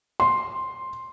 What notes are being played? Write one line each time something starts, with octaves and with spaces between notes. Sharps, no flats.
C6